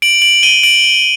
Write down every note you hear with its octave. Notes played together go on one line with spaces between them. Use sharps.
D7 F#7
D7 F#7
D#7 G7
D7 F#7